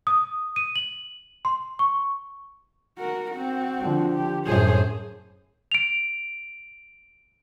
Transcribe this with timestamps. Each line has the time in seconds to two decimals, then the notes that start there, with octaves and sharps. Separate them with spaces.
0.07 D#6
0.56 D#7
0.76 F#7
1.45 C6
1.79 C#6
2.98 F#4 A#4
3.31 C4 F#4
3.80 D3 F3
4.13 G4
4.46 F#2 A2 G#4 C5
5.72 D7 F7